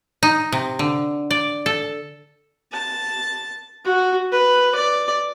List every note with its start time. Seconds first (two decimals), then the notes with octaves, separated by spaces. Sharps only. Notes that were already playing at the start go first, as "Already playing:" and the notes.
0.23 D#4
0.52 C3
0.79 D3
1.31 D5
1.66 A4
2.72 A5
3.84 F#4
4.32 B4
4.75 D5